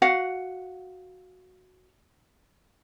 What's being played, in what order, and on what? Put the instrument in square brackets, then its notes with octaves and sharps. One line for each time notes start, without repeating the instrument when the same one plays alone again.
[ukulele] F#4 F5 F#5